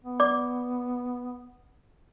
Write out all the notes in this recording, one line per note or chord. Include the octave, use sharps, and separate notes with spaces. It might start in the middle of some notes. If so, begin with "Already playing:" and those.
B3
D5 D6